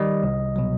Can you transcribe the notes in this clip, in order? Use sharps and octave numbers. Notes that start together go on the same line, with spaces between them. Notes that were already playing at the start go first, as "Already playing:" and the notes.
Already playing: D#3 G3 D#5
C2
B2 F#3